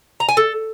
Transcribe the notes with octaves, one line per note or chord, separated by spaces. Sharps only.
A#5
G#5
A4